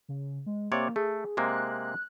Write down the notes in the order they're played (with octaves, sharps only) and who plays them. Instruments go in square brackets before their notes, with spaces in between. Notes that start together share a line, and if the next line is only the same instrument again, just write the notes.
[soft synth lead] C#3
G#3
[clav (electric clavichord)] C3 C#5 D5 [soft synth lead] A#3
[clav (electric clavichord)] A3 [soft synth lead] G#4
[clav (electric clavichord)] C3 G#3 A#3 [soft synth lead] F#6